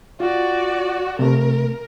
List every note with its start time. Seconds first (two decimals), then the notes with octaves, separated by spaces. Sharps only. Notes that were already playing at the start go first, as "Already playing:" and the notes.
0.20 F4 F#4 D5
1.19 C3 A3 A#4